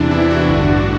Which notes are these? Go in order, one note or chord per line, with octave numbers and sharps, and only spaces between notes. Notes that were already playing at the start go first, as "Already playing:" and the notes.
Already playing: E2 C3 E3 D4
E4
D4 F#4
A1 G2 D3